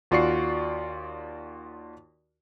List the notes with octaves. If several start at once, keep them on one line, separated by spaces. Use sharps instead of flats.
D#2 F4 F#4 D5 C#6 C7